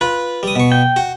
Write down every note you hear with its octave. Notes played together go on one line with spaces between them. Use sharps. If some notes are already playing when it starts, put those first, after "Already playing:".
F4 B4
G3 D#6
B2 C#6
G5
F#4